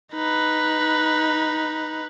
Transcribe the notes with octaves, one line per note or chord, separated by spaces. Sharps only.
D#4 B4